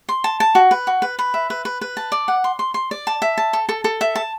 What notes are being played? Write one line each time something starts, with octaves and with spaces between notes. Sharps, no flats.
C6
A5
A5
F#4
B4
F#4
B4
B4
E5
B4
B4
B4
A5
D5
F#5
C6
C6
C6
D5
A5
E5
A5
A4
A4
A4
E5
A5